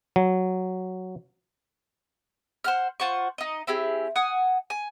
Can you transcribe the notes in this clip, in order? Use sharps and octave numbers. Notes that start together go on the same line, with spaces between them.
F#3
C5 F#5 F6
F4 C5 F#5 C#6
D#4 D#5
C4 E4 G4 G#4
F#5 G#5 D#6
G#5